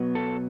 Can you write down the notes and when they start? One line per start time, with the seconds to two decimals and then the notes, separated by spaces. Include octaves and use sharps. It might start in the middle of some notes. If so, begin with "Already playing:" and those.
Already playing: B2 F#3 B3
0.15 A4